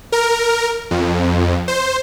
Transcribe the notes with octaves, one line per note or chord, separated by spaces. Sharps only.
A#4
F2
C5